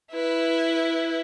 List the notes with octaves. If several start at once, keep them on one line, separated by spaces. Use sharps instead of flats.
E4 B4